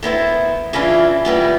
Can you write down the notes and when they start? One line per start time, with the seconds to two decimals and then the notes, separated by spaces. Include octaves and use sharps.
0.03 D#3 B3 E4 C5
0.73 C#3 E3 C#4 D4 E4 F4
1.25 A#2 E3 G3 B3